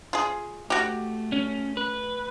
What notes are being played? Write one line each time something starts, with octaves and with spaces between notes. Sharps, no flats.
F4 G#4
A3 F#4 G4
C#4
B4